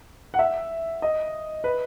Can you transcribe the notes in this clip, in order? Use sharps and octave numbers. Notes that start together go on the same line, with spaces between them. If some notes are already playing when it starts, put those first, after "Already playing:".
F#5
E5
D#5
B4